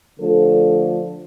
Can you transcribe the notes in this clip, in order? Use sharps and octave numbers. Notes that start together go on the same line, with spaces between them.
D3 F3 A3 A4